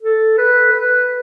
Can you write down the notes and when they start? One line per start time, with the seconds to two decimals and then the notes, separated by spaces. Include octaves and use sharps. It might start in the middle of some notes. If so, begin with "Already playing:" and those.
0.02 A4
0.38 B4
0.73 B4